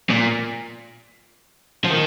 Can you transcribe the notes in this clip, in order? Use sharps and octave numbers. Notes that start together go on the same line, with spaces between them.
A#2
F3
D#3